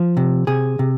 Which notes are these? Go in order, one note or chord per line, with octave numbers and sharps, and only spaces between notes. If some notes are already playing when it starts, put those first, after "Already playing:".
Already playing: F3
C3
C3 G#4
C3